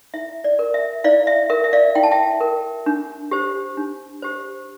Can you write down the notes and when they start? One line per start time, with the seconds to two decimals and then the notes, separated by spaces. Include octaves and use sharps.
0.14 E4 E5
0.44 D5
0.59 A#4
0.74 E5
1.04 E4 D5 F5
1.27 E5
1.49 A#4 E5
1.64 E5
1.73 D5 F5
1.95 E4 G5
2.03 A5
2.11 E5 G5
2.41 A#4
2.86 D4
3.31 G4 C5
3.77 D4
4.22 G4 C5